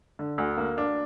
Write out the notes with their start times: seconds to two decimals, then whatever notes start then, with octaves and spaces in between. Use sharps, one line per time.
0.19 D3
0.38 D2
0.57 A#3
0.78 D4